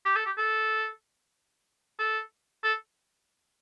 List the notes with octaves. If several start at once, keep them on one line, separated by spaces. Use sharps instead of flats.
G4
A4
G4
A4
A4
A4